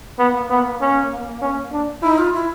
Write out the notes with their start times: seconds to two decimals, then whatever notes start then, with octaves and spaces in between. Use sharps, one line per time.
0.18 A#3 B3
0.50 B3
0.81 C#4
1.41 C#4
1.72 D4
2.02 D#4 E4
2.18 F4
2.34 E4